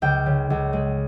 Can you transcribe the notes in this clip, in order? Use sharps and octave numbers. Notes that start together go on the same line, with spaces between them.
C#2 G5
C#3
C#2
G#3